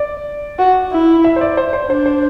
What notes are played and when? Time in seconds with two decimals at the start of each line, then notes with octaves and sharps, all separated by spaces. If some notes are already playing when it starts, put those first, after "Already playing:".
Already playing: D5
0.59 F#4
0.92 E4
1.24 E5
1.36 C5
1.41 D5
1.57 C5
1.73 C5
1.89 D4 C5
2.06 C5